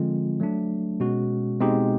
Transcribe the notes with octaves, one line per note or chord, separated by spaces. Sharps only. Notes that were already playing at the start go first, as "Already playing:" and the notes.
Already playing: D3 F3 G#3 C4 F4
F#3 A3 D4
B2 G#3 C#4 F#4
B2 G#3 C4 D#4 G4